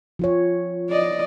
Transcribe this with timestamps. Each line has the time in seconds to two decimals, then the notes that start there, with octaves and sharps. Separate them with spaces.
0.19 F3 F4 C#5
0.91 D5 D#5